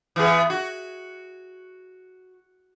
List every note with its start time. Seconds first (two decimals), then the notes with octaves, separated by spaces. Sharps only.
0.16 E3 B3 G#4
0.50 F#4